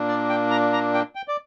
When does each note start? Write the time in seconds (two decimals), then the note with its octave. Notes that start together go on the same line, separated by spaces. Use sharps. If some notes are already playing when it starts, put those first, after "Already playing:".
Already playing: A#2 A#3 D4
0.08 D5
0.29 G5
0.50 A#5
0.73 A#5
0.94 G5
1.15 G5
1.28 D5